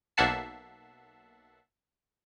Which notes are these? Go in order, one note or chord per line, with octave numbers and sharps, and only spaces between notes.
B1 A#3 E5 F#5 A5 C7